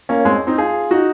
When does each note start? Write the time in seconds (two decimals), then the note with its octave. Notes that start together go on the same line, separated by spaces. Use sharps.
0.09 A#3 C#4
0.25 G#3 C4
0.47 C4 D#4
0.58 F4 G#4
0.91 D#4 F#4